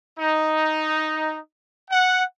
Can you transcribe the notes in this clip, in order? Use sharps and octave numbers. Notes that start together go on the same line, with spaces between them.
D#4
F#5